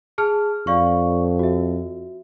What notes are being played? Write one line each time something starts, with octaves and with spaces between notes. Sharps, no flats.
G#4 A5 F6
F2 D5 F5 C#6
F#4 E5